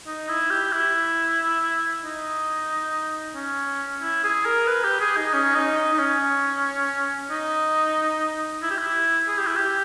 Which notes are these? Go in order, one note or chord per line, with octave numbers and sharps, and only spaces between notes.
D#4
E4
G4
E4
D#4
C#4
E4
G#4
A#4
B4
G4
G#4
D#4
C#4
D#4
D#4
D#4
C#4
D#4
E4
G4
E4
G#4
G4
E4
G4